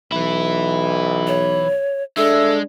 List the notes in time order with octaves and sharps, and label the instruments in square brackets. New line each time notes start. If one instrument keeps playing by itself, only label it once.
[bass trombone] B1 [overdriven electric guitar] E3 E4
[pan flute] C#5
[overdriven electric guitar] G#3 [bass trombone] D4 [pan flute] A4 [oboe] E5